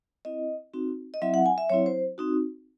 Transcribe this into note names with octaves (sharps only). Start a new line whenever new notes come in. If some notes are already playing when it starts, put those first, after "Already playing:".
C4 E4 D#5
C4 D#4 F#4
D#5
F#3 C4 E4 E5
F#5
G#5
E5
F#3 C4 E4 C#5
C5
C4 D#4 F#4